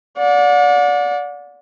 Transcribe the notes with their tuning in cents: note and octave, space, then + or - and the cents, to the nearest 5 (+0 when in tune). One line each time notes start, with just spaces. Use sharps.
D5 -20 F#5 -40